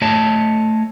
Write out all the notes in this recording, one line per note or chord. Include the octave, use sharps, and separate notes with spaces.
A3 C#5 D#5 A5